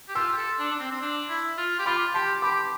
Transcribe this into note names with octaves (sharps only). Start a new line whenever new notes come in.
G4
F4 C6 E6
G4
A4
D4
D4
C4
C4
D4
E4
F4
G4
F4 B5 D6
G4 A5 C6
G4 B5 D6